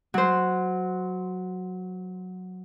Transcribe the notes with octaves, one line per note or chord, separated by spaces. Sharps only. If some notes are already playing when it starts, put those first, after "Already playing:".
F#3 C5